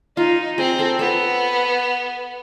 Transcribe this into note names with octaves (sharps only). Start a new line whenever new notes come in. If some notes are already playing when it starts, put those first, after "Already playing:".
D#4 F4
C4 G#4
A4
B3 A4